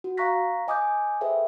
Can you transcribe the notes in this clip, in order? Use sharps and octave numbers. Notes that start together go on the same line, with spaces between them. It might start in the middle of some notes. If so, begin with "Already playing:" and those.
F#4
F5 A#5 C#6 F#6 A#6 B6
D#5 G#5 D6 D#6 F#6 G6
G#4 A4 B4 C5 E5 G5